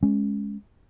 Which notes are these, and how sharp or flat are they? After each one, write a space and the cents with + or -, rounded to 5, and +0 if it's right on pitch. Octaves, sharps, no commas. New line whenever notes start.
G#3 +0 C#4 +0